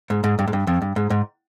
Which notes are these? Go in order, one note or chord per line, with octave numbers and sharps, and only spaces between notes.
G#2
G#2
G2
G#2
G2
F2
G2
G#2
G#2